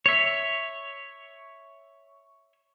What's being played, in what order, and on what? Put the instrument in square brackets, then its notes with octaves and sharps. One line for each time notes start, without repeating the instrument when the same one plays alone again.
[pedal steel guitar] C#5 E5